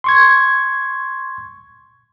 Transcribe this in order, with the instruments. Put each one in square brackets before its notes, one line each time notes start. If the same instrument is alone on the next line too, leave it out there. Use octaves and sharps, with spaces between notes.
[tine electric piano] C6 C#6 G#6